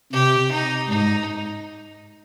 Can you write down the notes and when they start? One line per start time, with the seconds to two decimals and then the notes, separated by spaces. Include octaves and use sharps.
0.13 C3 G4
0.51 D#4
0.89 G#2 D#4